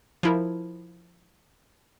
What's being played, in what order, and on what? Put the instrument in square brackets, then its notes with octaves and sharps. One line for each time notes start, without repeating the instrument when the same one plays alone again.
[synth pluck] F3 E4 A#4